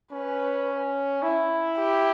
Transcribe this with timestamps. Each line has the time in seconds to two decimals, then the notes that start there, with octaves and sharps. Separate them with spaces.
0.12 C#4 B4
1.23 E4
1.77 G4